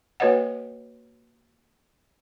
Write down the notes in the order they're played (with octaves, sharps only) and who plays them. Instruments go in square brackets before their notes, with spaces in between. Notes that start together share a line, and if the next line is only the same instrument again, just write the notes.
[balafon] A#3 F#4 B4 C#5 D#5 F#5